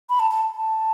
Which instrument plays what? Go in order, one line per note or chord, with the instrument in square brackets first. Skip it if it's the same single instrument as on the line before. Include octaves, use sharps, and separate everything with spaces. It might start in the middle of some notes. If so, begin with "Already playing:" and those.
[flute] B5
A5
A5
A5